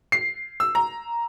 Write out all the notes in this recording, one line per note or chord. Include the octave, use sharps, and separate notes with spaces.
C7
E6
A#5